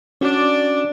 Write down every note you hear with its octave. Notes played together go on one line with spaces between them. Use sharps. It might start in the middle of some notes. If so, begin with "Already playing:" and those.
C#4 D4 F#4 D5